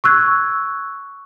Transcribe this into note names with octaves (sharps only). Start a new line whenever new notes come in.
C#6 E6 F#6 G#6